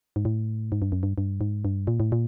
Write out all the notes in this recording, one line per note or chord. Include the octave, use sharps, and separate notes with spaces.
G#2
A2
G#2
G2
F#2
G2
G2
G#2
G2
A#2
A2
A#2